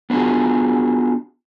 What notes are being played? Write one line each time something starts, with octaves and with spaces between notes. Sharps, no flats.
B3 D4 F4 F#4 G#4